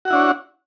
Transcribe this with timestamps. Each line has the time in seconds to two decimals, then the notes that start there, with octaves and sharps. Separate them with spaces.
0.05 F#4
0.08 F#5
0.10 E4
0.13 D4
0.15 C#5